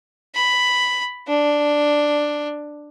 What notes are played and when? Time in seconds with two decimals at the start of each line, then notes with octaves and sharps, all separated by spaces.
0.35 B5
1.28 D4